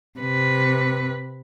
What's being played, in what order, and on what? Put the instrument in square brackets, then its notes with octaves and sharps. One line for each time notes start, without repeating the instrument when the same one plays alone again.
[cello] C3 B4